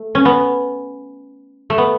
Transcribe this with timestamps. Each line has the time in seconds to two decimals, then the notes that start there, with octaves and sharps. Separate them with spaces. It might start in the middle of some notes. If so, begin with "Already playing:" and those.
Already playing: A3
0.15 C#4
0.25 B3
1.70 A3
1.78 B3